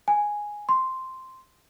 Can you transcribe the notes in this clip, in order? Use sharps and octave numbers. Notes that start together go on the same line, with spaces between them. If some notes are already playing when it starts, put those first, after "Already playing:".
G#5
C6